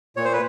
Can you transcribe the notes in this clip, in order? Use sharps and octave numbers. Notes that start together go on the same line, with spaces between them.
A#2 C#5
C5
B4